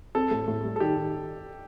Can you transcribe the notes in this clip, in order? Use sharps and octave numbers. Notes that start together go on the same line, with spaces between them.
C4 A4
A2
A2
G3
A4
D#3 G4
D#3